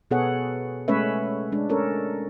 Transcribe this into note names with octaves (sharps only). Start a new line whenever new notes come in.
B2 B3 G#4 A4 C#5 F#5
G#3 A3 C#4 B4 C#5 E5
G#3 D4
C#4 A4 A#4 C#5